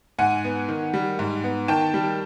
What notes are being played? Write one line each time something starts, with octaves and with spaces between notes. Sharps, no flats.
G#2 F#5 G#5
B3
D#3
G3
G#2
B3
D#3 G5 A5
G3